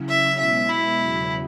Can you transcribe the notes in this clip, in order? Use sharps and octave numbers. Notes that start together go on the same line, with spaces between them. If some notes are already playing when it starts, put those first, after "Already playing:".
Already playing: C#3 F#3 C#4 E4
E5
B2 G#3 B3 E4 E5
E4
E2 C#3 F#3